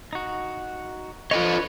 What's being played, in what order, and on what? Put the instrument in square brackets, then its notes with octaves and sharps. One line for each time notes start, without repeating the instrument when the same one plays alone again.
[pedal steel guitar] D#4 F#4
[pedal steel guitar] D4 B4 C#5 [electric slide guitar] F4 A4 D#5